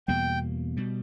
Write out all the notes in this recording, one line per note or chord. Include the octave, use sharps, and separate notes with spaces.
E2 B2 G3 A#3 G5
B2 G3